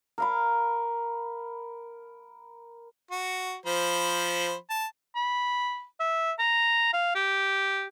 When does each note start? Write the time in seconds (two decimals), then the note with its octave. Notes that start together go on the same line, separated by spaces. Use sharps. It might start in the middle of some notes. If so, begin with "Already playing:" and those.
0.18 A#4 F5 B5
3.11 F#4
3.66 F3 C5 B5
4.69 A5
5.15 B5
6.00 E5
6.39 A#5
6.93 F5
7.15 G4